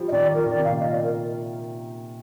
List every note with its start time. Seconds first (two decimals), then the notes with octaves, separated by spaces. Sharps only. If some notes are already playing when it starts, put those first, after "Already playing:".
Already playing: F3 G3
0.08 D#5
0.12 D#3 D5
0.35 F3 A#4
0.46 D#3 D5
0.58 C3
0.64 A#2 F5
0.80 D#5
0.92 D5
1.03 A#4